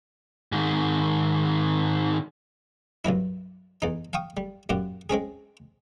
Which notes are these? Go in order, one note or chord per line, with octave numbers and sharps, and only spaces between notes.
G#2 D#3
C2 G2 F#3 E4
E2 D#4
F5 G5 C#6 D#6
G3
F#2 A#2 G4 F#5
G#3 C4 C#4 G#4